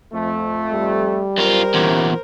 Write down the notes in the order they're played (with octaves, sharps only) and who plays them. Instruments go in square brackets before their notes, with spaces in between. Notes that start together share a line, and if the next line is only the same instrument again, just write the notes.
[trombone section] F2 A3
[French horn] G3
[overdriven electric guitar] F#2 F4 [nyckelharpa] A#4 C5
[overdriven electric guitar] E2 A#2 [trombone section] C#4 E4 G4